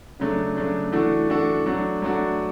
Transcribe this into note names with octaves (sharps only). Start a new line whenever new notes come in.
C#3 F#3 A3 D4
C#3 F#3 A3 D4
E3 A3 D4 F#4 A4
E3 A3 D4 F#4 A4
F#3 A3 D4 F#4
F#3 A3 D4 F#4